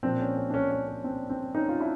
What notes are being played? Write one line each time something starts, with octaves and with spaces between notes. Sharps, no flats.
A#2 F3 C4 D4
C#4
C#4
D4
C#4
C#4
C#4
C4 D4
C4 D4
C#4 D#4
F4
D4 E4